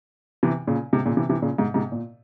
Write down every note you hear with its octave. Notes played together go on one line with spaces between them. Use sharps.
C3 E3
A#2 C#3
G#2 C3
A#2 C#3
C3 E3
C3 E3
A#2 C#3
G#2 C3
G#2 C3
A#2